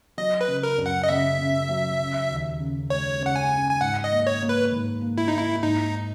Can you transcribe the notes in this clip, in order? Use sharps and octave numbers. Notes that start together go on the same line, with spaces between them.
F#3 D#5
B4
C#3
A#4
F#2
F#5
D#5
C#3 E5
C#3
F#3
C#3
D#2
C#3
G#3 C#5
C#3
F#5
G#5
C#4
G#5
G#2 F#5
D#5
A#3
C#5
A#3
B4
G#2
A#3
E4
A#3 D#4
E4
G#2 D#4